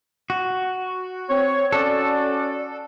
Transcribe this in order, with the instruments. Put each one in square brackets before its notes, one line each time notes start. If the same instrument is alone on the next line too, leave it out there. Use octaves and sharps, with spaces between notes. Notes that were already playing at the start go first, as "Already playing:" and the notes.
[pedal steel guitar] F#4
[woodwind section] C4 C#5
[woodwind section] C#4 F#4 D5 [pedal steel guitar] A4